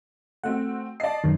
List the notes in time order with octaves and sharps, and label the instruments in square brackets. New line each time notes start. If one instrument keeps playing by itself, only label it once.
[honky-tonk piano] A3 C4 F#4 [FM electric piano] F#5
[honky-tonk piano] D5 C7 [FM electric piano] D#5 A5
[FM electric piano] F#2 D#3 [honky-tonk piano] C#4